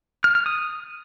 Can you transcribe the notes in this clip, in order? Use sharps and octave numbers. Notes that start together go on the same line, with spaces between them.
F6
F6
D#6